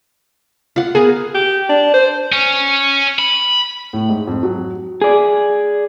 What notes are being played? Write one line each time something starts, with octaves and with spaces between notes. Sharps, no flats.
F4 F#5
B3 G#4 A#4
G4
D4
C5
C#4
B5
A2
G#2
F2
F#3
G#4 D5